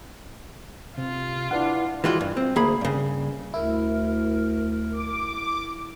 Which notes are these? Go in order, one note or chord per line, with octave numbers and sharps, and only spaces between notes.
C3 F4
D4 E4 B4 F#5 C7
E3 G#3 F4 F#4
G2
C4
D2 A#3 G#4 B5
G2 C#3
D2 E4 A#4
D6